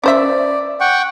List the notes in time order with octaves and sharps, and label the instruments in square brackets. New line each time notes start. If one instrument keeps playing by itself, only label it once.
[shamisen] C#4 C5 E5 [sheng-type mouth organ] D5
[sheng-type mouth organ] F#5 G5 C#6